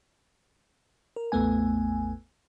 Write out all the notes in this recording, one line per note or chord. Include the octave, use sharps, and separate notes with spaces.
A#4
A1 E2 A3 B3 G#5